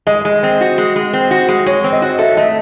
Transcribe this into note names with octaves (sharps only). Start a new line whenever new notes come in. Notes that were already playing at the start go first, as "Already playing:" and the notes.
G#3 D#5
G#3
C4
F#4
G#3
G#3
C4
F#4
G#3
G#3 C#5
C4
D#5
F#4
A4 E5
A3 D#5